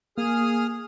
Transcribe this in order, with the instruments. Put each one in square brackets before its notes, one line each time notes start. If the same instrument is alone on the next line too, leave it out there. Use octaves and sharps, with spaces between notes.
[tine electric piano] A#3 [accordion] G#4 D#6 F6